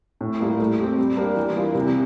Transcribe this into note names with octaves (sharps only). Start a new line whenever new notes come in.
A2
G3 A#3 F4 A#4
A3
C4 G4
G3
A#3 D4 G4 A#4
E3
G3 D4 F4 A#4
C3